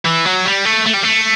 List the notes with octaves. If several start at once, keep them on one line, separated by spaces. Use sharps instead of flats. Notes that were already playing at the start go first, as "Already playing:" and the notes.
E3
F#3
G3
A3
A3
G3
A3